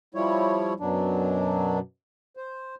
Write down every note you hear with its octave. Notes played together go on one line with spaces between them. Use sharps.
F3 G3 E4 C#5
F#2 B2 F#3 D4
C5